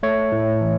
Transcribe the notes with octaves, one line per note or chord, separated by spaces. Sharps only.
A3 C#5
A2
E3